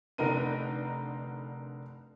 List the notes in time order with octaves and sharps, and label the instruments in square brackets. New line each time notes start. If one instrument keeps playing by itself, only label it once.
[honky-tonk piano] F1 D3 D#4 A#4 B4 D#7